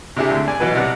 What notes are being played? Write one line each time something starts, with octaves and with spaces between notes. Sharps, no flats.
C3 D4 E4 G4 G#4
D2
D5 G#5
B2 E3 F#3 B4
C3 G3 D5 F#5